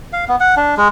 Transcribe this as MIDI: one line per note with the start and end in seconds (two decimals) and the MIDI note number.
0.13 0.25 77
0.28 0.36 59
0.40 0.55 78
0.57 0.75 62
0.77 0.88 56